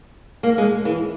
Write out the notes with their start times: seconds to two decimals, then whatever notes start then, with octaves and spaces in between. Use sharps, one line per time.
0.43 A#3
0.58 G#3
0.85 E3